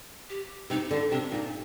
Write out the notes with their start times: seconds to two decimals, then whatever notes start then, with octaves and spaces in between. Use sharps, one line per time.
0.30 G4
0.70 C3 D#4
0.91 D3 D4
1.11 C3 D4
1.32 A#2 D#4